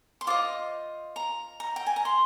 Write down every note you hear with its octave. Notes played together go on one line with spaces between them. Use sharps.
C6
F4 C5 D#5 D6
A#5
A#5
G5
G#5
A#5
C6